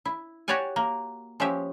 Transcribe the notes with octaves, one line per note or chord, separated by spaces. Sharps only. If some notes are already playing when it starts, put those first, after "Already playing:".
E4
F#4 G4 C#5 D5 F#5 G#5
A#3
F3 G#3 C#4 G4 E5